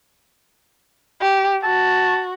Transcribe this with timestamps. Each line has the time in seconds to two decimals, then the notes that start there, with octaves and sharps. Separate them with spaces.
1.21 G4
1.63 F#4 A5